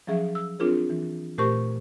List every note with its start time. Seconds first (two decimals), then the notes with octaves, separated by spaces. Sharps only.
0.07 F3 F#3 C#4 G#4 E5
0.35 E6
0.59 C4 D4 F4 G#4 A#4 C#5
0.90 E3
1.38 A#2 A3 G4 A#4 C5 C#6